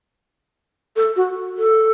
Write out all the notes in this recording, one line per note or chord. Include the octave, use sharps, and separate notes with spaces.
A4
F#4
A4